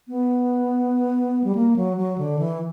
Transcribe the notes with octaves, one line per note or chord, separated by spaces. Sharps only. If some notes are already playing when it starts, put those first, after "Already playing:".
B3
G3
A#3
F#3
F#3
D3
E3